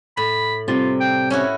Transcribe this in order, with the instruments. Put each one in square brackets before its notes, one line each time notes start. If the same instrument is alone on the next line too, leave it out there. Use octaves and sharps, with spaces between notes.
[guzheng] A2 [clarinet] B5
[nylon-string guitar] C3 G3 [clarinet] F4
[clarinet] G5
[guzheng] C#4 E4 F#4 [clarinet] C#5